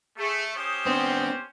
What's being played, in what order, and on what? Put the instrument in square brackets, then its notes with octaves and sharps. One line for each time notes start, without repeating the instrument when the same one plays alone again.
[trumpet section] A3 [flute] G#4
[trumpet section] C#4 G4 C5 [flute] D#6
[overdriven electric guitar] B3 D4 [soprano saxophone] C4